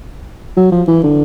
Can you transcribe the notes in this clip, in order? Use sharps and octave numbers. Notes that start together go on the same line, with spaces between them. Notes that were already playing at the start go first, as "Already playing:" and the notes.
F#3
F3
E3
D3